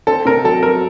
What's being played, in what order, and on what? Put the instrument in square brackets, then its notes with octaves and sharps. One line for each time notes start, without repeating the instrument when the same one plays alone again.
[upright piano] C4 A4
C3 A#4
F#3 A4
F#3 A#4